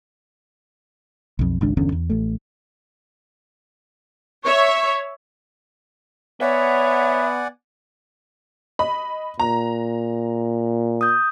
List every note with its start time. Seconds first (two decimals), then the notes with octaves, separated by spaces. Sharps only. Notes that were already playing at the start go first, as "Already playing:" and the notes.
1.39 B1 F2
1.61 G#1 C#2 D4
1.77 G1 E2 D3 C#4
1.92 E2
2.10 A1 A3
4.44 C#5 E5 C#6
6.41 B3 C#5 D5 E5 F#5 G#5
8.79 D#5 B5
9.40 A#2 A#5
11.01 D#6 G6